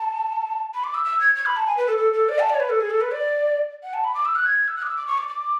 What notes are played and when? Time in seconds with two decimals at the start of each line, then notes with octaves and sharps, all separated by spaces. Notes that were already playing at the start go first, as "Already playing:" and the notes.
Already playing: A5
0.74 B5
0.84 D6
0.94 E6
1.05 E6
1.20 G#6
1.36 G#6
1.46 B5
1.57 A5
1.66 G#5
1.77 B4
1.87 A4
1.98 A4
2.13 A4
2.29 D5
2.39 A5
2.50 D5
2.55 C#5
2.60 B4
2.70 A4
2.80 G#4
2.90 A4
3.01 B4
3.12 D5
3.83 F#5
3.94 A5
4.04 B5
4.15 D6
4.25 E6
4.35 F#6
4.46 G#6
4.68 E6
4.76 F#6
4.82 D6
4.87 E6
4.97 D6
5.07 C#6
5.18 D6
5.28 D6